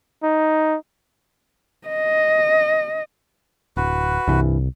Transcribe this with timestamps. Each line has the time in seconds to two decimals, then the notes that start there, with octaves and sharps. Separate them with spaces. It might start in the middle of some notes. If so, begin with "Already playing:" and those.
0.23 D#4
1.88 D#5
3.77 D1 F#4 B4
4.28 C2 G2 E3